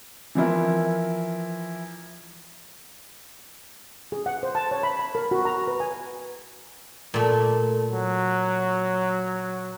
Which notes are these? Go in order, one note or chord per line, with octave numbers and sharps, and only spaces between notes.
E3 F3 E4 A#4
G#4
F#5
C5
A5
C#5
B5
B5
A#4
F#4
A#5
B4
G#5
A#2 A3
F#3